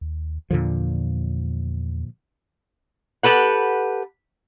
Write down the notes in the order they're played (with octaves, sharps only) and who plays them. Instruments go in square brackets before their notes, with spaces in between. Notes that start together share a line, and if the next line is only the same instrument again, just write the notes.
[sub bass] D#2
[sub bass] E2 [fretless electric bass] A#2 D3 F3
[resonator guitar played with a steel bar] G4 A4 B4 F#5